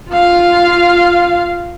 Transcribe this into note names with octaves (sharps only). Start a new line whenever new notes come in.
F4 F5